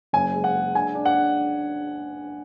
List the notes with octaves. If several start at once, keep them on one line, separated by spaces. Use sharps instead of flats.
F#1 G#5
G#3
F#5
G#3
D4 G#5
D4
F#5
D4